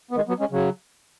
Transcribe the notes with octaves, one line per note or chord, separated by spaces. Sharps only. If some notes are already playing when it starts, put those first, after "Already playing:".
B3
D#3 G#3
F#3 B3
G#3 C#4
C#3 F#3